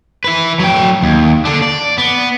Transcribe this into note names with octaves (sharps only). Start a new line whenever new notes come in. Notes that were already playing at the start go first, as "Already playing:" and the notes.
E4 B4
F#3 G5
D#2
D3 D4
D5
B3